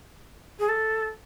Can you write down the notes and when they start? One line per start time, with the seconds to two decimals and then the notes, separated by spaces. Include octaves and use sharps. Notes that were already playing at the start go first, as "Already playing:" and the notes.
0.59 G#4
0.69 A4